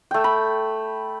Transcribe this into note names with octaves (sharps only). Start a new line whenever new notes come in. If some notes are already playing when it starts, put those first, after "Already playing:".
A3 G5
B5